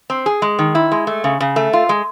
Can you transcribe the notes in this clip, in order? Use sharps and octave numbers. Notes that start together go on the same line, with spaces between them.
C4
G#4
G#3
D#3
E4
G#3
A3
C#3
C#3
A3
F4
G#3